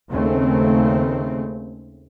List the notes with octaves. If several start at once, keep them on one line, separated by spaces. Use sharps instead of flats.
D#2 C#3 A3 C4